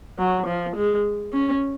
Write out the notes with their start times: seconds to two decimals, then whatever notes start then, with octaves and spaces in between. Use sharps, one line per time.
0.19 F#3
0.46 F3
0.76 G#3
1.32 C#4